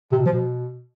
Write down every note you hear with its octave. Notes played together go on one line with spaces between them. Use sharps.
C3
B2
F3
B2